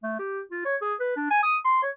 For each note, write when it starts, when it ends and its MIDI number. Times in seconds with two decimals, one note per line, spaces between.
0.03 0.16 57
0.19 0.41 67
0.52 0.62 65
0.65 0.76 73
0.82 0.94 68
1.00 1.15 71
1.17 1.28 62
1.31 1.41 80
1.43 1.57 87
1.65 1.82 84
1.83 1.90 73